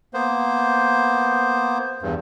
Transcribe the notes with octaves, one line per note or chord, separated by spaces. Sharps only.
A#3 B3 C5
E2 G2